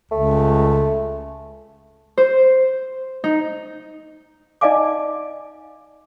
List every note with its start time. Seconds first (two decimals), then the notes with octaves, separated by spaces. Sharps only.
0.11 C#2 A3
2.18 C5
3.24 D#4
4.61 D#4 D5 D#5 F5 G#5 D6